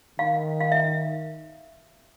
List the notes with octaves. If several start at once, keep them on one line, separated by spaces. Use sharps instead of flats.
D#3 F5
F5
E5